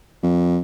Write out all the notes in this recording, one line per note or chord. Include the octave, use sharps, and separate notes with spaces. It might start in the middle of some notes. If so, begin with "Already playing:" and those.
F2